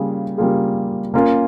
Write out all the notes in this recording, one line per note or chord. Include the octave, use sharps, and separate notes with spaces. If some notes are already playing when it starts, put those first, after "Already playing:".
Already playing: C#3 G3 A#3 F4 G#4
C#3 G3 A#3 F4 G#4
A#3 C#4 F4 A#4